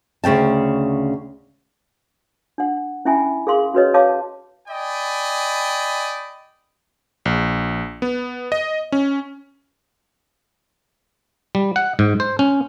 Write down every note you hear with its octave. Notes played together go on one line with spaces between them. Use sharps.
D2 C#3 G5 A5
D4 F#5
C#4 E4 E5 G5 G#5 B5
G#4 A#4 F5 C6
C#4 F#4 A#4 B4 C#5 D#5
C#5 F5 A5 C6 D6
D5 D#5 G5 G#5 B5
A#1
B3
D#5
C#4
G3
F#5
G#2
C5
C#4